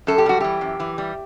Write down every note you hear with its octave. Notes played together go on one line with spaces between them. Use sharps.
F#2 A4
G4
G3 F#4
E3 G4
F#2
E3
G3